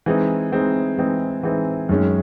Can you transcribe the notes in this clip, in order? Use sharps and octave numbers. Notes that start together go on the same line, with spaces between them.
E3 G#3 C4 D#4
E3 G#3 C4 D#4
E3 G#3 C4 D#4
E3 G#3 C4 D#4
F#2 D#3 G#3 C#4